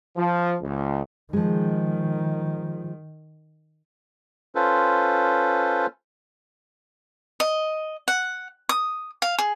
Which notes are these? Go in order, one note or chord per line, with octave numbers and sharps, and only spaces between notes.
F3
C#2
D#3 F3 G#3
C#4 F4 A4 B4 C5
D#5
F#5
D#6
F5
G#4